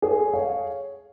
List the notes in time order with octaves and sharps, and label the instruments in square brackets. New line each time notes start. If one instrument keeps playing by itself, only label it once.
[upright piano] G#4 [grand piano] A4 C#5
[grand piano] C#5 F5